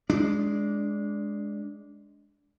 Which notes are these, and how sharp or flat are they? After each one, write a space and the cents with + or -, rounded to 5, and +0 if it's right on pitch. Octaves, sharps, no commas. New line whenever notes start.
G#3 +0 D4 -15